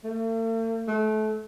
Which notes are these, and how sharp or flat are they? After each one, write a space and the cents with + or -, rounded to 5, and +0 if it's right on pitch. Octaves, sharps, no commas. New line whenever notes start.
A3 +45
A3 -30